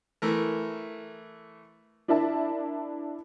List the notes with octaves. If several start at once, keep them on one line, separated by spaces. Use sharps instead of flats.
E3 A3 A#4
D4 E4 A#4 E5 A5